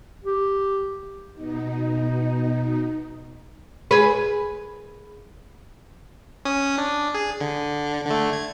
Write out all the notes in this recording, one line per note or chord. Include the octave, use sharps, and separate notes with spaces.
G4
B2 D#4
G#4 B4
C#4 D#6
D4
G#4
D3
D3 A3
G#6